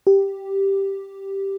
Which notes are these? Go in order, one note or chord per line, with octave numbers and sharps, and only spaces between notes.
G4